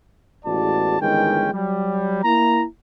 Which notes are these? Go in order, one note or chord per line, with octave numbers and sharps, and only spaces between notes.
A1 E2 G#3 F#4 D5 A5
G1 D#3 E3 G#3 C#4 G5
F#3 G3
A#3 E4 A#5